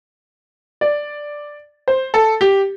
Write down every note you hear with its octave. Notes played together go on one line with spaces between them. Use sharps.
D5
C5
A4
G4